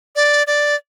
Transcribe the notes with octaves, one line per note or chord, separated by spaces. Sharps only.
D5
D5